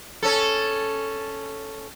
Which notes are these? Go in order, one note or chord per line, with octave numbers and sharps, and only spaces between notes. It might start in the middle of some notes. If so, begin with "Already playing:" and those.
C#4 A4